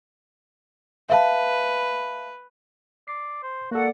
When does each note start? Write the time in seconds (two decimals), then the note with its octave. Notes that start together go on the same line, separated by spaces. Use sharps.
1.10 B4 E5 F5 A5
3.08 D5 C7
3.43 C5
3.71 A#3 F#4 A4 D5 F#5